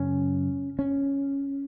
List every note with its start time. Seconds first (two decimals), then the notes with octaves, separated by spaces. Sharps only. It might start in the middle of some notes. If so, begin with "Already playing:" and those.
Already playing: F#2 C#3 C#4
0.79 C#4